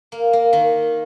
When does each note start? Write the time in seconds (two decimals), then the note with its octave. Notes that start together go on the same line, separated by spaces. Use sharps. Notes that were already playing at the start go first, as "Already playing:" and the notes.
0.12 A#3
0.33 A#3
0.53 D#3